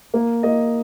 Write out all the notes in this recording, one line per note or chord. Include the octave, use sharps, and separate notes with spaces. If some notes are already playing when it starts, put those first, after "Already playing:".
A#3
A#3 D#5